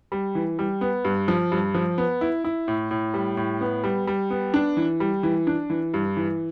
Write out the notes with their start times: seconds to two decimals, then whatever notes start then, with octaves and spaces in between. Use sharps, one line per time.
0.12 G3
0.35 E3
0.59 G3
0.81 B3
1.05 G2
1.28 F3
1.52 G2
1.75 F3
1.98 B3
2.21 E4
2.44 E4
2.68 A2
2.91 A2
3.14 G3
3.37 A2
3.61 B3
3.84 G3
4.07 G3
4.30 B3
4.54 D4
4.77 E3
5.00 G3
5.23 E3
5.47 D4
5.70 E3
5.94 G2
6.17 E3